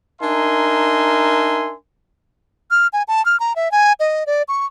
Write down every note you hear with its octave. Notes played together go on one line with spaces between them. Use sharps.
D4 D#4 A#4 E5 G#5 C6
F6
G#5
A5
F6
A#5
E5
G#5
D#5
D5
C#6